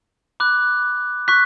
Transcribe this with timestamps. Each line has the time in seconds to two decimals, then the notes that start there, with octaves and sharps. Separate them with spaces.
0.40 B5 D6 F#6
1.28 C#6 F#6 B6